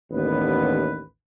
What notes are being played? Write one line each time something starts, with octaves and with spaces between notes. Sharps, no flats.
A1 D#2 D3 B3 B4